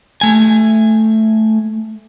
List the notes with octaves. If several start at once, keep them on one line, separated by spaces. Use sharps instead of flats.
A3 G#5